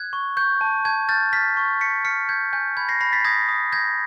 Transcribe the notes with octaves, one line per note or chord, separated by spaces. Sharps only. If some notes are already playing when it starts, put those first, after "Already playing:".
Already playing: F#6 G#6
C#6
C#6 G6
A5
A5 G#6
F6 G6 A6
F6 A6 B6
C#6
C#6 B6 C#7
F6 B6 C#7
G6 G#6
G#5 G6
B5 G#6
A#6 C7
B5 A#6 C7
A6 B6
D#6 G#6 A#6
D#6
G6 G#6 A#6